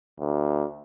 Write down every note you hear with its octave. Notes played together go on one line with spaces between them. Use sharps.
D2